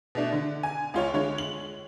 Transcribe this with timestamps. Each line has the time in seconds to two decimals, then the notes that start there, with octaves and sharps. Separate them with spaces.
0.15 B2 A3 D4
0.32 D3
0.63 G#5
0.94 C#2 F4 C#5
1.14 D3 G#3 C#5
1.38 F#7